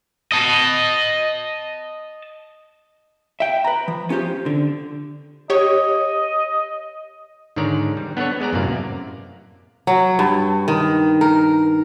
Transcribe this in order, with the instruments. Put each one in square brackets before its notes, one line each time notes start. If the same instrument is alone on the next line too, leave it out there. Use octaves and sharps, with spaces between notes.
[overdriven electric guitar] D#5 A5
[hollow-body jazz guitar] E5 G5
B4 A#5
F3
B3 C#4 F4 G4 C5
D3
[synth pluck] G4 C#5 [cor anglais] D#5
[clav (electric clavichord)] G#2 D3 D#3 C#5 D5 A#5
G3
B3 D4 A4 C#5
G#3 B3 D5 A#5
F#2 A2 C3 A#3 D5 F5
[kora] F#3
G2
D#3
A#4